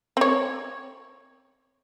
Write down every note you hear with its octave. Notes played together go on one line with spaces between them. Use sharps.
C4 C#5